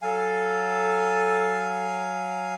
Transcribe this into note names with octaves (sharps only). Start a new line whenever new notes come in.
F#3 A4 F5 G#5